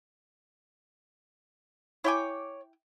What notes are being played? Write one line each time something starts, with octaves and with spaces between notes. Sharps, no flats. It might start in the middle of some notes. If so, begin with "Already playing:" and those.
E4 C#5 G5 G#5 D6